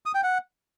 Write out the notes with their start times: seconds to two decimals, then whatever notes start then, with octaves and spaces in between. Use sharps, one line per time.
0.06 D#6
0.15 G5
0.23 F#5